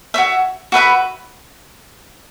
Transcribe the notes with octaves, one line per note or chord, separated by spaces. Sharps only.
F#4 C#5 E5
F#4 B4 E5 B5